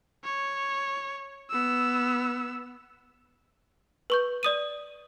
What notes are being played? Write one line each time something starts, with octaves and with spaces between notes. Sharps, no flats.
C#5
B3 E6
B4 C#6 G6
D5 D#6 D#7